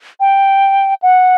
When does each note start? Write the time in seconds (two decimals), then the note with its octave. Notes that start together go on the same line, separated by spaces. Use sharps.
0.20 G5
1.02 F#5